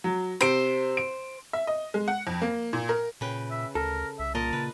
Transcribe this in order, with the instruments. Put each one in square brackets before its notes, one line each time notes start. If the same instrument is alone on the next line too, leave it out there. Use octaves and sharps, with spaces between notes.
[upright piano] F#3
[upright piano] C3 D7 [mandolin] C5
[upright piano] D7
[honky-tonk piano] E5
D#5
G#3
F#5
F2
A#3
A#2
A#4
[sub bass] A#2 [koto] C#3 B4 G5
[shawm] E5
[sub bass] D2 [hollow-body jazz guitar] A4 [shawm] A#4
[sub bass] C2 [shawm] E5
[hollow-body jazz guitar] A#2 [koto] A#4 D#5 [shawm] A5
[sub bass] C#3 [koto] B4